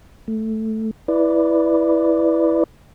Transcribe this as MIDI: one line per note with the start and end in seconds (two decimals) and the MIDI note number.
0.28 0.91 57
1.08 2.64 64
1.08 2.64 71
1.08 2.64 74